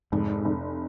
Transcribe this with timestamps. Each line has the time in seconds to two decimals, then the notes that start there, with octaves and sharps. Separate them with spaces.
0.12 F1 G#2
0.45 F1